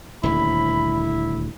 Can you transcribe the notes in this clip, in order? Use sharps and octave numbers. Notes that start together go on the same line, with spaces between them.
D#1 D2 E4 B5